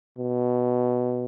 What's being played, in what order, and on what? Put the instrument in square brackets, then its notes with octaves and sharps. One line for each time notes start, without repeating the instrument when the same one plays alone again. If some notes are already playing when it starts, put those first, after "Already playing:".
[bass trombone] B2